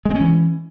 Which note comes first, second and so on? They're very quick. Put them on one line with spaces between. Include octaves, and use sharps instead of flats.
G#3 C4 C#4 E3